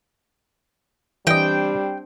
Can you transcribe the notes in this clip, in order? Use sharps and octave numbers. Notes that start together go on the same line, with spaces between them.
E3 G3 C4 D4 D#5 G5